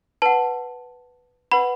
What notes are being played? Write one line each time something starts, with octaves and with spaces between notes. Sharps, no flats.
B4 F#5 A5
B4 F#5 B5